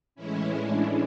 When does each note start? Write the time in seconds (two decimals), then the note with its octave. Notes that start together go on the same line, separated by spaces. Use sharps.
0.15 A2 E3 G#3 C#4 E4
0.56 D4